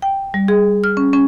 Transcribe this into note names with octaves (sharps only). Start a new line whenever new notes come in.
G5
G3
G#4
F6
C#4
C#4